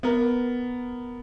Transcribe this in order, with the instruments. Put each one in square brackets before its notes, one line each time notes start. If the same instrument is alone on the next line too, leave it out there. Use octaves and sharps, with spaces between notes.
[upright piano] B3 A#4